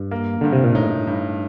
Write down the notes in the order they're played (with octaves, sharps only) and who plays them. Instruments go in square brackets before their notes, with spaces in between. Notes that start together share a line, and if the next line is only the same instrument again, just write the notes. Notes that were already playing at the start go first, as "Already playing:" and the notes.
Already playing: [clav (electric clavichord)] G2
[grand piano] A#3
[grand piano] G2 [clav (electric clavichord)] D3
[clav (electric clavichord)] C3
A#2
[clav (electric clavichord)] A2 [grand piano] D#4
[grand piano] G2